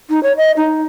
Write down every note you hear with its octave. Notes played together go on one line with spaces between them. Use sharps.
D#4
C#5
D#5
D#4